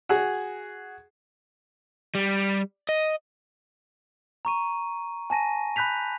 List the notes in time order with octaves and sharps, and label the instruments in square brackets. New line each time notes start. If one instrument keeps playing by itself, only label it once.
[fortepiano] F#4 G#4
[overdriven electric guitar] G3
D#5
[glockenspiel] A#5 C#6 D#7
G#5 A5 A#6 D#7
B5 F#6 G6 B6 F7